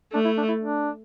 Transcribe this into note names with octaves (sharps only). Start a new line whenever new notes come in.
A3 D4
E4
D4
E4
D4